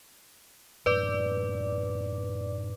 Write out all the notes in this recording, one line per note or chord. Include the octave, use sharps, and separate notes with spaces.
F#2 A2 C#4 B4 D5 D6